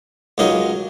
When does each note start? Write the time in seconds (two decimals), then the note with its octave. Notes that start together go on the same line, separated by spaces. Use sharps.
0.38 C#2 C#3 F#3 D#4 A#4